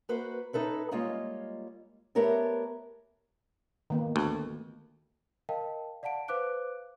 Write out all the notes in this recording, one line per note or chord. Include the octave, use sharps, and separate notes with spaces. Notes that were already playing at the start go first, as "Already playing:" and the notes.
A#3 F#4 B4 C5
D#4 A4 B4 C#5
G3 G#3 A#3 F4 C#5 D#5
A3 B3 G4 A#4 C#5 D5
D#3 A#3 B3
D2
A#4 D#5 F5 G5 A5
D5 F5 F#5 A5 D7
B4 C5 F5 D6 F#6 D7